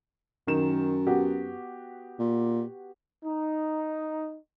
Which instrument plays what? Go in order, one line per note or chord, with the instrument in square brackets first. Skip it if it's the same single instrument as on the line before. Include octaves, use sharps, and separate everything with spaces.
[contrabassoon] F#2 [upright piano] D#3 E7
[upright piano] B3 F#4 G4
[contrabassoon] A#2
[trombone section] D#4